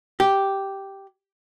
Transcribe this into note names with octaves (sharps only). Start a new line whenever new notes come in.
G4